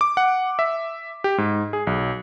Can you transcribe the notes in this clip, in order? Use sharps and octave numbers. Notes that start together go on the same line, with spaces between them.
D6
F#5
E5
G4
G#2
G#4
B1